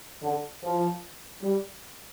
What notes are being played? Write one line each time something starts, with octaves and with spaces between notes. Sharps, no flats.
D3
F3
G3